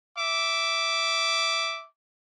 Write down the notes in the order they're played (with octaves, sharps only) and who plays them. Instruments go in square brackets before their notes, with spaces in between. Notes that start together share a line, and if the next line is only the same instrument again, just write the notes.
[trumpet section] E5 D6